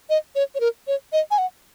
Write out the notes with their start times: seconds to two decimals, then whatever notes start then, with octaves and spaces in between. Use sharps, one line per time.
0.10 D#5
0.35 C#5
0.55 C#5
0.60 A#4
0.87 C#5
1.13 D#5
1.31 G#5
1.38 F#5